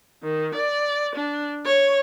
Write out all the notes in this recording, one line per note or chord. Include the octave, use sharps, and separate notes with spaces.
D#3
D5
D4
C#5